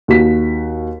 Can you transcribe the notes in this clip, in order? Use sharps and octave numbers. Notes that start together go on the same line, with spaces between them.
D#2 F#4 B6